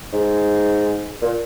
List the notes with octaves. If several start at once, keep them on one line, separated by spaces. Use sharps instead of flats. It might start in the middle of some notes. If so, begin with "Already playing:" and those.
G#2
A#2